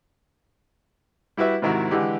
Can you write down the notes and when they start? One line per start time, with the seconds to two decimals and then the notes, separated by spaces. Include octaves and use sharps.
1.37 G3 E4 F#4 B4 E5
1.62 G#2 C3 D#3 E4 F#4
1.91 D3 E3 G#3 G4